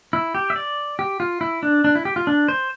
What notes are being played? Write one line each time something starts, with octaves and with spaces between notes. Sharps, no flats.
E4
G4
E5
D5
G4
F4
E4
D4
D4
E4
G4
F4
D4
C5